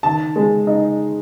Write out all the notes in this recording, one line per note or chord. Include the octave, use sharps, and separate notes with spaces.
D#3 A5
G#3
D#4